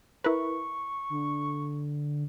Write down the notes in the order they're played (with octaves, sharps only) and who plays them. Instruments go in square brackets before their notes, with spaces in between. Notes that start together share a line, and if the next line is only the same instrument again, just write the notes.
[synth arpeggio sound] E4 A#4 B4 [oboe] C#6
[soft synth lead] D3